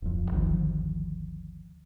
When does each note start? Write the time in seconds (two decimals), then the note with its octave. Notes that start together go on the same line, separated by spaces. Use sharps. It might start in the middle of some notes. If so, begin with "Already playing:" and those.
0.02 D1 F2
0.31 G1 D2 D#3 F3